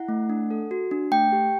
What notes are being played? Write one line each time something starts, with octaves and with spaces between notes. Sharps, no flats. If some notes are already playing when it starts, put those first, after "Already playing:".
Already playing: E4 F#5
A3
D4
A4
F#4
D4
A3 G5
G4